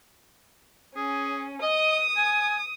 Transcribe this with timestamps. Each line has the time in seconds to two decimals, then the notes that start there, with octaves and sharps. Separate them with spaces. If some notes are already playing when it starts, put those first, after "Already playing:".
0.96 C#4 G#4
1.62 D#5 D#6
2.17 G#5